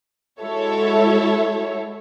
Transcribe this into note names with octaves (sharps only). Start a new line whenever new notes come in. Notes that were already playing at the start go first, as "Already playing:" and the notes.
G#3 E4 F#4 A4 C#5 E5